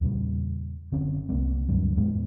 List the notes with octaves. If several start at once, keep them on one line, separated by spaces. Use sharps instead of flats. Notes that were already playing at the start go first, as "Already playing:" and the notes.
E2 A#2 C#3 G3
F#1 D3 C4 C#4
C2 A3 A#3 C4
D2 G2 D3 F#3
E2 A2 G#3 B3